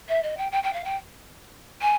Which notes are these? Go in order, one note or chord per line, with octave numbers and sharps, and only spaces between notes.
E5
D#5
G5
G5
G5
F5
G5
G#5